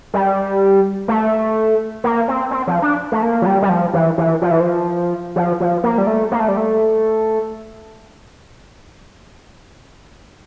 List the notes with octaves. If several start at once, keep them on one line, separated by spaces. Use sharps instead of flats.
G3
A3
A#3
C4
C4
F3
D4
A3
A#3
F3
G3
G3
F3
E3
E3
F3
E3
F3
F3
F3
A#3
G3
A3
A#3
A3
G3
A3